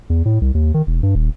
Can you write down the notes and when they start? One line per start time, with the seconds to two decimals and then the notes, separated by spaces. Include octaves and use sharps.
0.10 E2
0.25 A2
0.41 C2
0.55 D#2
0.74 D#3
0.87 E1
1.03 G2
1.15 D#1